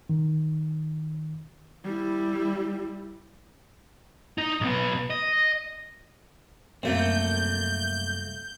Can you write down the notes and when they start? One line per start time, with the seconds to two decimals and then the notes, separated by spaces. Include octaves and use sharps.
0.10 D#3
1.84 G3 E4
4.38 D#4
4.61 B1 B3
5.10 D#5
6.83 C2 F#2 A3 A#3 C4 G6